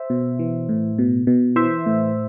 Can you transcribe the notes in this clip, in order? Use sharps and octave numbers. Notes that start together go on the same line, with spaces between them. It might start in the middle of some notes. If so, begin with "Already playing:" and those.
Already playing: C5 E5
B2
E3
A2
B2
B2
E3 C5 E5
A2